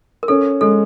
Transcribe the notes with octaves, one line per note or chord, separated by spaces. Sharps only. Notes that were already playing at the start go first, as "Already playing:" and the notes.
A#4
C#4 A4
G#3 A4